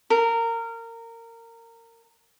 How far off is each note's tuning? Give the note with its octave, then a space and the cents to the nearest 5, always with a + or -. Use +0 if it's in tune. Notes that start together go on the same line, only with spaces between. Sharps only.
A#4 -20